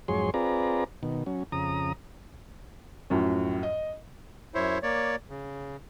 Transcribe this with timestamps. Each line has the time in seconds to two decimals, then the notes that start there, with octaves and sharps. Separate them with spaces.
0.08 F2 G#2 F#3 G#4 C#5 C6
0.34 C4 F4 G#4 B4 D5 A#5
1.03 B2 D#3
1.26 F#3 C#4
1.52 F2 C#3 A#5 D#6
3.10 F#2 A2 F3 C#4
3.63 D#5
4.55 F#2 E4 C5 C#5
4.83 A#3 C#5 D5
5.30 C#3